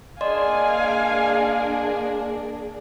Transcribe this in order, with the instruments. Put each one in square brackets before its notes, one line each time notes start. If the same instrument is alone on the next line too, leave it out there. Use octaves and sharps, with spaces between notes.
[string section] A#3 D4 G#4 [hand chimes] D5 D#5 C6 [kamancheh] F5 G#5